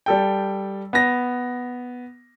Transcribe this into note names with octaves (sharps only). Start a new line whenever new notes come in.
G3 A4 G5
B3 A#6